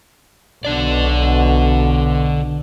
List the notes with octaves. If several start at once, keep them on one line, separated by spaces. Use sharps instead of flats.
B1 B2 D3 D4 D5